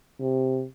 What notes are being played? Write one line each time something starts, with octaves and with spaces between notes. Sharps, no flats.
C3